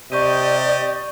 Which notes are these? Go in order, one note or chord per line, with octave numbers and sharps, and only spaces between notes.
C3 G4 D5 D#5 C#6 G6 D#7